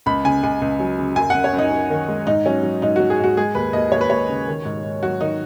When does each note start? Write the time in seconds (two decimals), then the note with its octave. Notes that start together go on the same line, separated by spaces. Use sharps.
0.06 C#2 B5
0.25 C#3 G#5
0.43 C#2 G#5
0.62 C#2
0.80 F#3
0.99 C#3
1.16 F#2 G#5
1.30 F#2 F#5
1.44 C#5
1.53 F#2
1.58 D#4
1.71 F#2
1.90 D#3
2.08 G#3
2.27 G#2 D#4
2.46 F#3 C#4
2.63 F#3
2.82 G#2 D#4
2.96 F#3 F#4
3.10 G#4
3.19 G#2 F#4
3.37 G#3 G#4
3.55 D#2 B4
3.73 D#2 D#5
3.92 D#2 C#5
4.01 B4
4.10 D#2 C#5
4.29 C#3
4.48 D#3
4.65 G#2
4.83 G#2
5.03 F#3 F#4
5.21 D#3 D#4